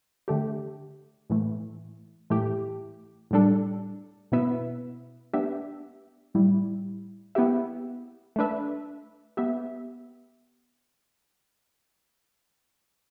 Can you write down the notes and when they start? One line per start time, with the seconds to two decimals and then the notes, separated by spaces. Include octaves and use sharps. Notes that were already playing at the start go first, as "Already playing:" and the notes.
0.28 D3 A3 G4
1.30 A2 E3 A3
2.30 A2 E3 A3 G4
3.31 A2 G3 D4 A4
4.32 B2 B3 E4 B4 E5
5.33 B3 D4 G4 E5
6.34 A2 G3 E4
7.35 B3 E4 G4 E5
8.36 A3 D4 B4 E5
9.37 B3 G4 E5